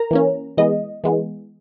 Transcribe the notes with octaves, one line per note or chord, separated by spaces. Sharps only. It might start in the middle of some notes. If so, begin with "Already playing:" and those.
Already playing: A#4 A#5
E3 A#3 C#4
E3 G#3 B3 D#5
E3 G#3 B3